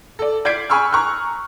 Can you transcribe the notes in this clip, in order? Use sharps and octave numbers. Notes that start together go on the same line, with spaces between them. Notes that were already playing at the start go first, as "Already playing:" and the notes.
A4 D5
D5 G6 G#6 B6 C7 D7
G#5 B5 C#6 E6 F6
A#5 C#6 F6 F#6